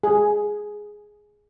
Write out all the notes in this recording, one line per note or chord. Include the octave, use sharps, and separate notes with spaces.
G#4